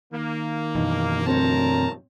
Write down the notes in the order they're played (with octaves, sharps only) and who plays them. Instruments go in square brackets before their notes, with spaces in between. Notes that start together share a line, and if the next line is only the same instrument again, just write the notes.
[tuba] D#3 [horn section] A#3
[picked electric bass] F#2 B2 E3 [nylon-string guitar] D#4
[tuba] D2 [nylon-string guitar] C4 C5 C#5 [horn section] A#4 A5 A#5